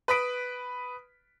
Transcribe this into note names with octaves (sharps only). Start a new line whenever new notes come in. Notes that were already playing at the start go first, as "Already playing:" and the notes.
B4 B5 D#6 B6 D7